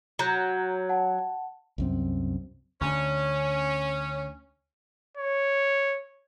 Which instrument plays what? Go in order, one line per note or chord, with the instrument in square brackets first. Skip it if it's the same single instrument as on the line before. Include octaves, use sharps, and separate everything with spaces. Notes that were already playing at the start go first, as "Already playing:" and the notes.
[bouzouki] F#3 [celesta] A#5 G6
[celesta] F#5 A5
[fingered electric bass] C2 F#2 C4
[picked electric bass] D2 [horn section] C#4
[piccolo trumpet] C#5